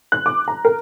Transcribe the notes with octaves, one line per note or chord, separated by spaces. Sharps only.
F#6
D6
A#5
A#4